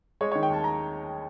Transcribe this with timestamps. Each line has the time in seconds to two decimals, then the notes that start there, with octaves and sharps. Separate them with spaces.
0.21 G#3 C#5
0.32 D#3 C#5
0.43 G5
0.50 D#2 A5
0.64 A#5